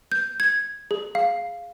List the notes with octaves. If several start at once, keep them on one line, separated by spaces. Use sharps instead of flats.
G6
G#6
G#4
F5